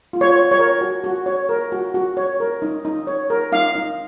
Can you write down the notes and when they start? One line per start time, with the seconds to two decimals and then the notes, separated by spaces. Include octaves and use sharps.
0.13 F4
0.21 C#5
0.36 C#5
0.51 C#5
0.59 A#4
0.81 F#4
1.04 F#4
1.26 C#5
1.49 A#4
1.72 F#4
1.94 F#4
2.17 C#5
2.40 A#4
2.62 D#4
2.85 D#4
3.07 C#5
3.30 A#4
3.52 D#4 F5
3.75 D#4